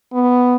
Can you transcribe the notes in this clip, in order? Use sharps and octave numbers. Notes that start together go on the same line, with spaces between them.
B3